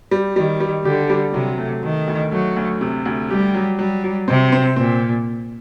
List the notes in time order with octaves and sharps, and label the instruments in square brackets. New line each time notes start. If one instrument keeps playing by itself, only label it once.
[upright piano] G3
[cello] D#3 [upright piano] G3
[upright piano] G3
[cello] D3 [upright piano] G4
[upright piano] G3
[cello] C3 [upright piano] F#3
[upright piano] A3
[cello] D#3 [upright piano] A3
[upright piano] D2
[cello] F#3 [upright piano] A3
[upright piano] D2
C3
D2
[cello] G3 [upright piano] G4
[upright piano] F#3
[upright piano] F#3 [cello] G3
[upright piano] F#3
[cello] C3 [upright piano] C4
[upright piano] C4
[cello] A#2 [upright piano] C4